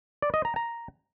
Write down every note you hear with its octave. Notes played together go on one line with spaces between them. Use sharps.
D5
D#5
A#5
A#5